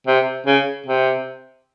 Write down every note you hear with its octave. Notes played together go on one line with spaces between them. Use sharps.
C3
C#3
C3